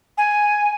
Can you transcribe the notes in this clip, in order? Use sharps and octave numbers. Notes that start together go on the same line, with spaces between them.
G#5